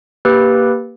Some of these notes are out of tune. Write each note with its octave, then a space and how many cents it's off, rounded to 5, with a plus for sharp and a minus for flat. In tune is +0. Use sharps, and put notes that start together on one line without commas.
A#3 +0 G4 +0 B4 -5